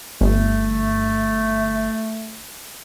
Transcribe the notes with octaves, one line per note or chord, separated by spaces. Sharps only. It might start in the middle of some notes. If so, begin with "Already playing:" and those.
G1 A3